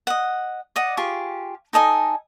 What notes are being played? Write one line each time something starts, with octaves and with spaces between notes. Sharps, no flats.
D#5 F#5
D5 D#5 F#5
F4 G4 G#4 C#6
D#4 A4 D#5 G#5